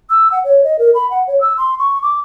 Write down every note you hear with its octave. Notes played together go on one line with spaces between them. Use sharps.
E6
F#5
C#5
D#5
A#4
B5
F#5
C#5
E6
C6
C#6
D6